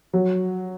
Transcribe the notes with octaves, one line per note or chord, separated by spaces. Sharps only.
F#3